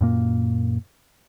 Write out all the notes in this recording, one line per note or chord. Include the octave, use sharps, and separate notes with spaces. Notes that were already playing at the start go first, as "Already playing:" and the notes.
F#2 A#2 A#3